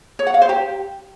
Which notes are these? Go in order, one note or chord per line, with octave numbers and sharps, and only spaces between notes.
C#5
F#5
F5
C5
G4